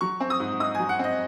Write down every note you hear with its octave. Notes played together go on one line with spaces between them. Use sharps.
F#3 C#6
C4
D#6
G#2
D#4 D#6
G#5
F#3
F#5
C4 D#5